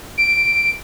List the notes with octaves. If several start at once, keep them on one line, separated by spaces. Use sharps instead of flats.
D7